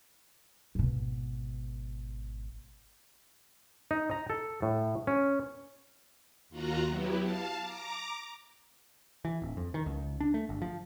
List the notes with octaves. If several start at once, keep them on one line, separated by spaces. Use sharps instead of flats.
G#1 B2
D#4
A#5
A4
A2
C#4
D#2 F4 F#4 F#5 A#5
F#3 B3 E4 G4
F5 A5
A#5 D6
E3
D1
F2
D#3
C#2
D4
A3
G1
F3